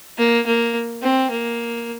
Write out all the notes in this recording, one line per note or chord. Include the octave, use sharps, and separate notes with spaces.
A#3
A#3
C4
A#3